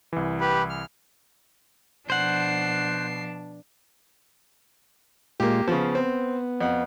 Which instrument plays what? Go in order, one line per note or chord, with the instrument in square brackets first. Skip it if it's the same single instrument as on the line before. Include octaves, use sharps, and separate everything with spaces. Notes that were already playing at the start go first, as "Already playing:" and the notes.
[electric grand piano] C2 E3
[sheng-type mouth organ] G4 B4 B5
F6
[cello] B2 F3 [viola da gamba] D4 [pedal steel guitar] C5 F#5 [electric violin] C7
[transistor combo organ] A#2 G#3 F4 [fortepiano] A#3 G4
[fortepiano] C#3 F3 [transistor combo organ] B3
[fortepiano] C4
F2 F#5